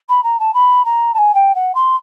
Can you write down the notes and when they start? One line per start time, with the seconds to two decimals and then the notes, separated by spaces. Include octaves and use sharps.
0.09 B5
0.23 A#5
0.39 A5
0.54 B5
0.85 A#5
1.14 A5
1.18 G#5
1.34 G5
1.55 F#5
1.75 C6